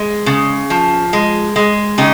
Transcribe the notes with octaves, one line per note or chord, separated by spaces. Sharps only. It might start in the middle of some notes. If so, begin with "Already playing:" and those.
Already playing: G#3
C#3
F3
G#3
G#3
C#3 D#4 G4